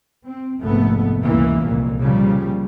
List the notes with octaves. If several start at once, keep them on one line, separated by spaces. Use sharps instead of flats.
C4
F1 A#1 G#2 A3 B3
C#2 F#2 E3 A#3
C2 F2 A#2
A#2 C#3 F3 G3